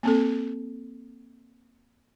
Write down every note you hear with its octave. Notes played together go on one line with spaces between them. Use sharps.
A#3 C4 A4